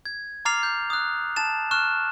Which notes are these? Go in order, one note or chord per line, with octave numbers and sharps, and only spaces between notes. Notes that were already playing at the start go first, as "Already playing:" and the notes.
G#6
A#5 D6 F6 A6 C7 F7
G6
D#6 F#6
A5 A6 E7
C#6 F6 F#6 E7